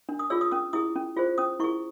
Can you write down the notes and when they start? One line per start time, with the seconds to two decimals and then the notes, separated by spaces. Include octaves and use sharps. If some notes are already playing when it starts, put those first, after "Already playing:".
0.09 D4
0.19 D#6
0.30 F4 G#4 C#5 E6
0.41 D#6
0.51 C#4 D#6
0.73 E4 G#4 D#6
0.96 C#4
1.17 F4 G#4 C5
1.38 C#4 D#6
1.60 E4 G#4 C#6